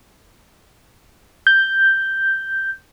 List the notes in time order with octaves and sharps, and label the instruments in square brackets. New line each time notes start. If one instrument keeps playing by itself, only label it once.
[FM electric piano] G6